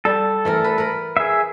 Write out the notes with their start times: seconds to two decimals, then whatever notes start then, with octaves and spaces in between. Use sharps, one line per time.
0.05 G3 A4
0.45 E3 A3 A#4
0.64 B4
0.78 A#4 B4
1.17 G#4 E5